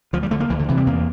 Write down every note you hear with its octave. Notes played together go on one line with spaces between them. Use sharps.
D2 F3
G3
D3 A3
A#3
D2 E3
D3
C3 E3
G3
E2 A#3